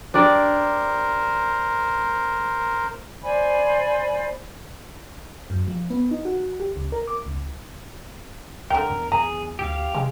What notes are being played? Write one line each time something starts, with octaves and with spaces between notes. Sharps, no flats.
D4 G4 A#4 C5 D5
C5 D5 G#5 B5
F#2
F3
B3
D#4
F#4
G4
C#2
A#4
D6
C#2
C2 D3 A#4 G5
E2
E2 G#4 A#5
D2 G4 F5
C3 G#3